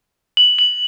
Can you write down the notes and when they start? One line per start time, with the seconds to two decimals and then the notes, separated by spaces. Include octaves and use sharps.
0.37 F#7
0.59 F#7